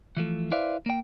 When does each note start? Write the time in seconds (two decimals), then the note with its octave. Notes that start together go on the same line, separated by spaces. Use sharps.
0.17 E3 F3 A3
0.52 E4 B4 C5 D5 E5 F5
0.86 A#3 G5